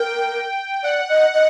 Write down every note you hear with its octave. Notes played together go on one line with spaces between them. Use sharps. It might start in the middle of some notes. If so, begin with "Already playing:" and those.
Already playing: A#4 G5
D5 F#5
D#5
D#5